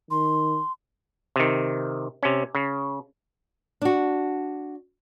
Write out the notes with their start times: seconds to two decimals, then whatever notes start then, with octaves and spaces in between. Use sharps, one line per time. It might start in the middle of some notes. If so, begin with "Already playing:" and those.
0.11 D#3 C6
1.36 C3 D#3
2.23 C3 C#4
2.55 C#3
3.82 D4 F#4